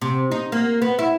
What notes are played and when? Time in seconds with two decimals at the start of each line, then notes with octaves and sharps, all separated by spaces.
0.02 C3
0.32 D#4
0.52 A#3
0.82 B3
0.99 E4